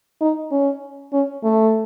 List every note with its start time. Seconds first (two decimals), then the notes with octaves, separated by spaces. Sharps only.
0.21 D#4
0.52 C#4
1.13 C#4
1.44 A3